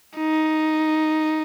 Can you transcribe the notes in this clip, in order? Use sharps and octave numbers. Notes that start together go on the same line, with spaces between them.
D#4